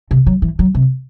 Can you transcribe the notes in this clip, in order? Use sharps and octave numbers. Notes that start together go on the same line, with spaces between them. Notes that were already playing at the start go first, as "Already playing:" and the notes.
C3
F#3
E3
F#3
C3